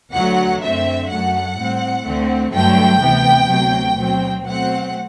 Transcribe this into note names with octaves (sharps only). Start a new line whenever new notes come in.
D2 D3 F#3 A3 F#5
F#2 D3 A3 C4 E5
F#2 F#3 A3 F#5
A2 G3 C4
D2 D3 A3 C4
G2 D3 F#3 A3 G5
D2 C3 E3 B3
D2 C3 F#3
B2 F#3 C4
B2 F#3 A3 C4 F#5